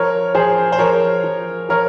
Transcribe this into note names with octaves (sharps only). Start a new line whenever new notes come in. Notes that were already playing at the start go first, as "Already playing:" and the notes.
Already playing: F3 A#4 C#5
F3 G#4 C5
C5
F3 A#4 C#5
F3
F3 A#4 C#5